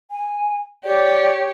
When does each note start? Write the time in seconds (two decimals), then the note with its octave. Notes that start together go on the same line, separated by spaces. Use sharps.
0.11 G#5
0.84 G4 C#5 D5